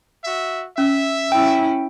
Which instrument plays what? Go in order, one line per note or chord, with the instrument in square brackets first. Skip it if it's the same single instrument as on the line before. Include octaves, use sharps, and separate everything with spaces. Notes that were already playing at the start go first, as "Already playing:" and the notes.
[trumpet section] F#4 E5
[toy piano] C#4 [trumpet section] E5
[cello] C#4 E4 [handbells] G5 [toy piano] E6